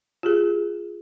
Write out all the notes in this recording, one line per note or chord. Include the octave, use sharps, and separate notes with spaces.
F4 G4 G#4